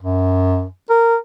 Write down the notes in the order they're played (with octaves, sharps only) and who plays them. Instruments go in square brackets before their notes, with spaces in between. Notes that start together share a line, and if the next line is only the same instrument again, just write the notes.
[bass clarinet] F#2
A#4